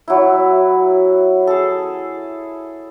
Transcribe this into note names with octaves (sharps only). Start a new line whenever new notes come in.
F#3 E4
G#4 A4